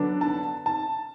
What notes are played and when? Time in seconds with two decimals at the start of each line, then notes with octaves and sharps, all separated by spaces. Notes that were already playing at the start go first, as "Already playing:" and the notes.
Already playing: D3 F#3 B3 D4
0.21 A5
0.66 A5